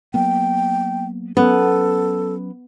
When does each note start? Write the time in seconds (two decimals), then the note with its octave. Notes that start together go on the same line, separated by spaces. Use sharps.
0.14 F#3 A#3 B3 G5
1.37 F#3 B3 C#4 A4